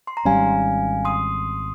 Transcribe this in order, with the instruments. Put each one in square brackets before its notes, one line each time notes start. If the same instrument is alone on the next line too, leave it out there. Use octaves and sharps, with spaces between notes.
[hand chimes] C6
A#5
[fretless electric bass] G#1 G#2 G3 C#4 [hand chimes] F5 G#5
[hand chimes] C6 D#6